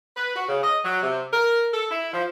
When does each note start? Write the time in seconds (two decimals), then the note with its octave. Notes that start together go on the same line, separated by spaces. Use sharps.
0.16 B4
0.35 F#4
0.49 C#3
0.63 D#5
0.84 F#3
1.03 C3
1.32 A#4
1.73 A4
1.91 E4
2.13 F3